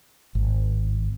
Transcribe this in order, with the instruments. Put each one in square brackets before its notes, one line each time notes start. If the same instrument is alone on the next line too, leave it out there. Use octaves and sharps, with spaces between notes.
[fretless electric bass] G#1